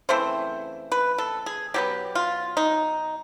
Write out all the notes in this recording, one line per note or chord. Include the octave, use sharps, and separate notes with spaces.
C#3 E3 A3 C4 C5
B4
A4
G#4
B2 F#3 B3 G4
F4
D#4